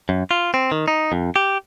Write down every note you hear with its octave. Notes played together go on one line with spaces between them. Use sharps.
F#2
F4
C4
D#3
D#4
F2
G4